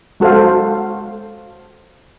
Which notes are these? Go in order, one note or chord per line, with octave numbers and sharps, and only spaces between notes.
G#3 F#4 A4 C5 F5